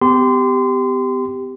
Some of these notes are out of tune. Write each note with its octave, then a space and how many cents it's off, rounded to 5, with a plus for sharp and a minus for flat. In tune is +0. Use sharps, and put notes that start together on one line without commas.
B3 +40 G4 +0 C6 -25